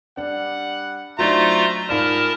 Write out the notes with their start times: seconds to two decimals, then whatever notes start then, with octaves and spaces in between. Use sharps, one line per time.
0.17 G3 D4 F#5
1.19 F#3 A3 D4 D#4 F4 C5 A#5
1.89 G#2 F4 G#4 A#4 D5 A5 B5